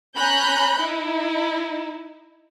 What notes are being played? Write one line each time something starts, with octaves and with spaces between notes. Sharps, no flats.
C#4 A#5 B5 F#6 G6
D#4 E4